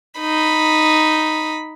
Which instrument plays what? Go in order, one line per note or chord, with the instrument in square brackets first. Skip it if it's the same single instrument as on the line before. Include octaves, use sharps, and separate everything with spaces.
[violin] D#4 B5